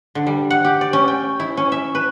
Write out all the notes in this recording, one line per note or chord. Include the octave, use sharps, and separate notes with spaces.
D3
G3
F#5
G4
D5
C#4
G5
E4
C#4
E5
B4